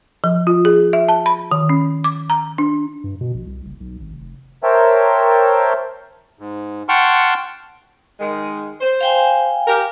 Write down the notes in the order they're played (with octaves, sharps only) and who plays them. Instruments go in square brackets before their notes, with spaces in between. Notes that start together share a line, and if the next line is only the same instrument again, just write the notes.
[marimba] F3
F4
G#4
E5
A5
B5
D#3
C#4
D6
A#5
D4
[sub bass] G2
B2
A#1
C2
F#1
B1
G#1
F1
[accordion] A#4 C5 C#5 E5 G5 A5
[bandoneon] G#2
F#5 G5 A5 C6 C#6 F6
[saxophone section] D#3 G#3
C5
[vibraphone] F5 G5 G#5
[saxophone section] G4 A#4